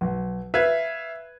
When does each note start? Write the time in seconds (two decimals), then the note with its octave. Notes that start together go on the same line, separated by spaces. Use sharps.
0.01 B1
0.54 B4 E5 F5 G#6